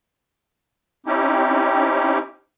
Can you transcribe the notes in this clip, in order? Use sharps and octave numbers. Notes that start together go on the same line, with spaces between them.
C4 C#4 D#4 E4 G4